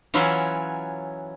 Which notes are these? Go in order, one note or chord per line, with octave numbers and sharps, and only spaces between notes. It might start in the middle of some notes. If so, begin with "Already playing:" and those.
E3 F#3 C#4 E4 F4